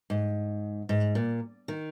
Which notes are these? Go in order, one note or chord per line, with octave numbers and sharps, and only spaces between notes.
G#2
G#2
A#2
D#3